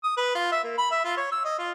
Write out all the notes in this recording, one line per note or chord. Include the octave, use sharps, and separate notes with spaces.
D#6
B4
F4
E5
A#3
B5
E5
F4
C#5
E6
D#5
F4